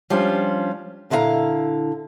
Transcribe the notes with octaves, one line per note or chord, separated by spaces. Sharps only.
F3 G3 C#4 D4 F4
A#2 D3 E4 B4 F5 A#5